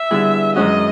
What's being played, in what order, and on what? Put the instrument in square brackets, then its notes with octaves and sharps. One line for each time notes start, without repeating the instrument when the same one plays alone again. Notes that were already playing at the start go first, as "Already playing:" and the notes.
Already playing: [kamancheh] E5
[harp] D3 G3 B3 E4 G#4
[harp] F#2 D#3 G#3 C#4 F#4 [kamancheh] D#5